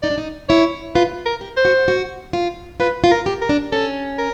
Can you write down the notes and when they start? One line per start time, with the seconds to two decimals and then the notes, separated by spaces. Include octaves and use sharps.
0.02 D#4 D5
0.10 D4
0.18 D#4
0.49 E4 C#5
0.95 F4 B4
1.26 A#4
1.41 G4
1.57 C5
1.65 F#4
1.88 F#4
2.33 F4
2.80 F4 B4
3.04 F4
3.11 A#4
3.26 G4
3.41 A#4
3.49 D4
3.72 C#4 A4
4.18 A#4